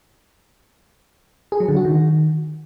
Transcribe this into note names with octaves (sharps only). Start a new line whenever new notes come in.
G#4
F#3
D3
F#4
D#3